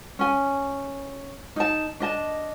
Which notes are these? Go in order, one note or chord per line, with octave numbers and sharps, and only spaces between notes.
C#4 G#5
D#4 A5
D4 D#5 A5